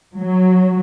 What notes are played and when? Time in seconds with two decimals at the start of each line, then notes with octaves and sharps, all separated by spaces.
0.19 F#3